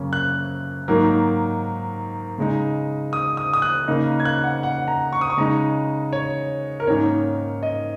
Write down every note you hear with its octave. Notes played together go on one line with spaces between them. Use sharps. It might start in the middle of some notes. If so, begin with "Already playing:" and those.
Already playing: F#2 C#3 A#3 C#4
F#6
G#2 D#3 F#3 A#3
C#3 G#3 D#4
D#6
D#6
D#6
F#6
C#3 A#3 D#4
G#6
F#6
F#5
F#5
A#5
C#6
D#6
C#6
C#3 G#3 D#4 A#5
C#5
A#4
G#2 D#3 A#3 C#4 C#5
D#5